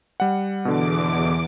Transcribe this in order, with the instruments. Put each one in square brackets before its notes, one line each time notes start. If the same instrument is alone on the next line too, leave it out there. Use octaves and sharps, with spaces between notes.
[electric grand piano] G3 F#5
[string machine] E2 D6 [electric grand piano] B2 D3